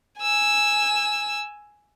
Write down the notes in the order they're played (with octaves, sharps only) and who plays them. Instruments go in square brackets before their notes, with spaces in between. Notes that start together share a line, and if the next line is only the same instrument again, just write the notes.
[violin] G#5 E6